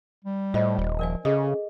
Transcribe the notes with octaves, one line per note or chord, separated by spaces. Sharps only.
G3
A2 F4 C5 D#5
D#1
F3 A#4 D5 G#5
C#3 C#4 G#4 A4 D#5